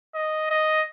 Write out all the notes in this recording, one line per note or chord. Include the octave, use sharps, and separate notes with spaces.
D#5
D#5